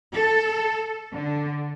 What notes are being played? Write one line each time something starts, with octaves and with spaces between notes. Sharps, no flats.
A4
D3